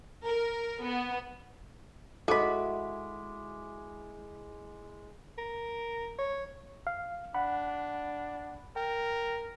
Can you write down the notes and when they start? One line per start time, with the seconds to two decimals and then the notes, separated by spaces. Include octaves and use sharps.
0.24 A#4
0.84 B3
2.28 G#3 E4 F#4 A4 D#5 B5 D6
5.38 A#4
6.18 C#5
6.87 F5
7.34 D4 F#5 B5
8.76 A#4 G5